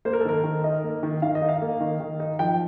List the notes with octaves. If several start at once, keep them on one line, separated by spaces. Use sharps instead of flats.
A#3 C5
A#4
A4
D#3 A#4
D#3
D#4 D#5
A#3
D#3
D#3 F5
D#5
D#4
F5
A#3
D#3
D#3
D#4
F3 G5